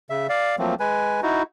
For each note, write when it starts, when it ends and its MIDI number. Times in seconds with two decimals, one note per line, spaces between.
0.10 0.27 49
0.10 0.27 76
0.29 0.56 74
0.29 0.56 77
0.59 0.75 53
0.59 0.75 54
0.59 0.75 57
0.59 0.75 58
0.59 0.75 60
0.80 1.21 56
0.80 1.21 71
0.80 1.21 80
1.23 1.43 63
1.23 1.43 64
1.23 1.43 66